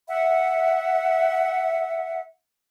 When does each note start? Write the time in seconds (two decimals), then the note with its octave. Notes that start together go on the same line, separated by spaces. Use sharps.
0.08 E5 F#5